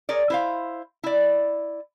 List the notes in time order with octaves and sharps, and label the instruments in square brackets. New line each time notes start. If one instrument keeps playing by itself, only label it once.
[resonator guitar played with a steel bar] G#4 A#4 C#5 D5
E4 C5 F5
E4 D5